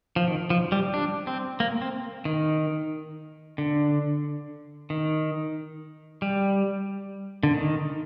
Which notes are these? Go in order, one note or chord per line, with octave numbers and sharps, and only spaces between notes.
F3
D#3
F3
G3
D4
C4
A#3
C4
D#3
D3
D#3
G3
D3
D#3